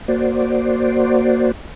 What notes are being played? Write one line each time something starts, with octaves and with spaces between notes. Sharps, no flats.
A#3 F#4 C5 D5